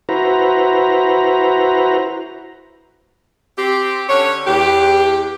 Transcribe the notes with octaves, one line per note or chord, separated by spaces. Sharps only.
E4 F#4 B4 C5 A#5
C4 G4
D3 C#4 C#5
E2 G4